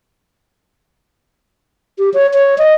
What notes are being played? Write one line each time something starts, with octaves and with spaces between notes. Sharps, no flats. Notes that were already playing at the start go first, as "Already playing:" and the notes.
G4
C#5
C#5
D#5